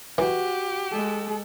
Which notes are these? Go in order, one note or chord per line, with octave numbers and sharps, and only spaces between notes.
E3 F#4 G4
G#3 A4